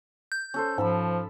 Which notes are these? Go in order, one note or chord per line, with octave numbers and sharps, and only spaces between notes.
G6
C#4 A4 C5
G#2 F3 C#4 A5 B5